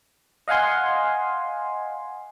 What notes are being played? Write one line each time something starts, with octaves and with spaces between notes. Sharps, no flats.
D#5 F5 F#5 G#5 C6